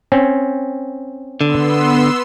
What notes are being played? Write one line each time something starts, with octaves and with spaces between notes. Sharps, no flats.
C4 C#4
D3 B3 C6 E6